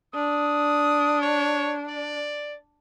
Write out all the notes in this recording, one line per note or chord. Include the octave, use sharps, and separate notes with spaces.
D4 D#6
C#5
D5